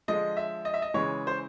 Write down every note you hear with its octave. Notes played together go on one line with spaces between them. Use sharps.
D3 F3 G#3 D#5
E5
D#5
E5
D#5
C#3 E3 G#3 C#5
C5